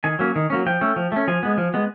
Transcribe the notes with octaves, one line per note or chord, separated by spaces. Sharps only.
D#3 G#5
F#3 A#3 C#4
D#3
F#3 A#3 C#4
F3 G5
A3 C#4
F3
A3 C#4
F3 G#5
G#3 B3
F3
G#3 B3